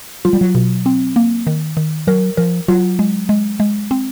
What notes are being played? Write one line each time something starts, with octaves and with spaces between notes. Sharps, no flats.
F#3 F4
G3
F#3
B2
C4
A#3
D#3
D#3
F#3 A#4
F3 A#4
F#3 F4
G#3
G#3
G#3
C4